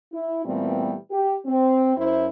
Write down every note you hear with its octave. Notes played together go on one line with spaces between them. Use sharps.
E4
A#2 E3 G3 A3 B3 C4
G4
C4
F#2 E4 C5